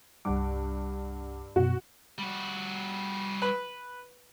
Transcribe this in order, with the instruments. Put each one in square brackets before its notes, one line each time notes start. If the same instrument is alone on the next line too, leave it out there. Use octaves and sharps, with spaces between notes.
[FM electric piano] C2 F#5 D6 [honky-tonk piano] G2
[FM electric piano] F#2 B2 [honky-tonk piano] F#4
[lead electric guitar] G3 F#4
[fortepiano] B4 B5